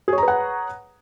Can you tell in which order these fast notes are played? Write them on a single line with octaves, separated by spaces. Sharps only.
G#4 C#5 A#5 B4 F#5